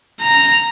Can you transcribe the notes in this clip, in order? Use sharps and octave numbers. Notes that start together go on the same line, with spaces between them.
A#5